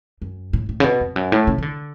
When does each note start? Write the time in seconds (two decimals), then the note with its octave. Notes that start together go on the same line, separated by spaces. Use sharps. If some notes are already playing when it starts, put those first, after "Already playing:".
0.22 F#2
0.53 A2
0.69 A2
0.80 C#3
0.84 B2
1.01 F2
1.16 F#2
1.32 A2
1.47 C#3
1.58 F3
1.62 D3